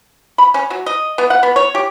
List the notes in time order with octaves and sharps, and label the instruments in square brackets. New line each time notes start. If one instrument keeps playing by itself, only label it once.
[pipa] B5
C#4
F#3
D#5
B3
F#5
B3
C#5
G4